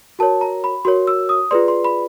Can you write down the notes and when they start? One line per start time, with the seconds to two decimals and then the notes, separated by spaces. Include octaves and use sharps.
0.19 F#4 A#4 C#5 A5
0.41 A#5
0.64 B5
0.85 F#4 A#4 C#5 C6
1.07 E6
1.29 D#6
1.51 F4 G#4 B4 D5 C6
1.68 C6
1.84 B5